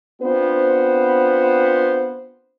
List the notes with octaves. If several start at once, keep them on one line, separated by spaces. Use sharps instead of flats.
B3 C4 D4 F4 C5